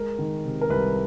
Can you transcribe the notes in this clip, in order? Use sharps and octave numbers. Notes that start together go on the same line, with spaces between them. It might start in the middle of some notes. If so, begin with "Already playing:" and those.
Already playing: G#3 A#4
D#3
C3
A#4
C2 B4